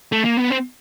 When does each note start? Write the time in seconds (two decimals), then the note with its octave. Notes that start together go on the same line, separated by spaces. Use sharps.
0.12 A3
0.25 A#3
0.37 B3
0.50 C4